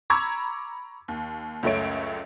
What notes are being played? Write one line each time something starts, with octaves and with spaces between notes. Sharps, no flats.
A#5 B5 C#6 D6 E6 G#6
D#2
C#2 F#2 A3 C#5 D7